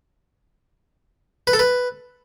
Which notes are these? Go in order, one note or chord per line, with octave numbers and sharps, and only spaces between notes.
B4
A4
B4